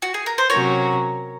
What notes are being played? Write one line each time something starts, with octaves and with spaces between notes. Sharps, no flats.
F#4
G#4
A#4
C5
C3 F#3 C#4 F#4 A#4 C#5